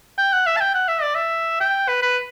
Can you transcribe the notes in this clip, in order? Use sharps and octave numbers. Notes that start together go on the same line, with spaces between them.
G5
F#5
E5
A5
G5
F#5
E5
D5
E5
G5
B4
B4